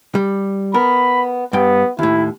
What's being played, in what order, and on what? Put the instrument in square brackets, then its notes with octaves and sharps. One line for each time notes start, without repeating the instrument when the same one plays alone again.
[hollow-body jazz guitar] G3
[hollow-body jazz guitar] B3 A#4 [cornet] B5
[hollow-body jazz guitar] G2 G5 [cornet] B3
[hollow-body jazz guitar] D#2 A2 [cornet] E4